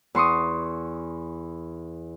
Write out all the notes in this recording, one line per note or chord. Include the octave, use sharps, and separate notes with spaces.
E2 C6 C#6 D#6